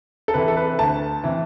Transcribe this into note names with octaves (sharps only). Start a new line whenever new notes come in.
A4
C3 E3 B4
A4
B4
D2 A5
C3 E3